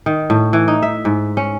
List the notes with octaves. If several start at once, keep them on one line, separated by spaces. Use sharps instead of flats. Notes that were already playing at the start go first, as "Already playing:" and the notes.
D#3
A2
E3
D#4
E5
G#2
C#4